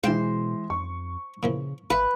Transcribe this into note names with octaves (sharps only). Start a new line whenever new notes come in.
B2 E3 G#3 C5 F5 G5 A5
F2 C#6
A#2 C#3 E3 F3
G#1 B4 E5 F5